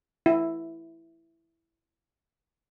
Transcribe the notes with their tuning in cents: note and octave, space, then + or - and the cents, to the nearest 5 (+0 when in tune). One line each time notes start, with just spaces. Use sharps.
E4 +5